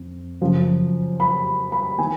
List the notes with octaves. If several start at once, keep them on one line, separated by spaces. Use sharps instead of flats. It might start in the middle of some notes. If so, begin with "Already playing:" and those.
Already playing: F2
F#2 C#3 F3
B5
B5
D#3 G#5